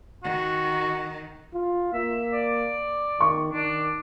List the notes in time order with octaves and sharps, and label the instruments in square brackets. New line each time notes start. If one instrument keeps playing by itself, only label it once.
[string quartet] D#3 [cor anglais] F#4
[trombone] F4
[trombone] A#3 [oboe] E5
[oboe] D5
[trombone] D#3 [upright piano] C#6
[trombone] D#3 [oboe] D4